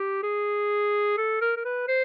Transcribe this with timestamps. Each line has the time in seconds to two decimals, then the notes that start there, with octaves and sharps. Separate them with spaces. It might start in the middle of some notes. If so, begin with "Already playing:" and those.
Already playing: G4
0.23 G#4
1.18 A4
1.41 A#4
1.56 A#4
1.65 B4
1.88 C5